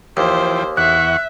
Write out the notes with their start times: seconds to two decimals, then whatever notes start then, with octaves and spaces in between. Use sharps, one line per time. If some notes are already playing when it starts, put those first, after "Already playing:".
0.17 D#2 E3 F3 C5 G5
0.77 E2 E5 F#5 C#6 F#6